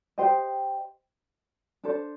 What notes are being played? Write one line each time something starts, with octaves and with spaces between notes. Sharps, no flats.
G4 C5 D#5 G5
D4 A4 C5